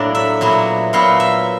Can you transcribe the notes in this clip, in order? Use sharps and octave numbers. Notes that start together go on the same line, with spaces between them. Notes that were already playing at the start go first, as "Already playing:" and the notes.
Already playing: A2 F#3 A#3 D4 D5
E5
A#2 F#3 B3 E4
A#2 F#3 B3 E4 F5
E5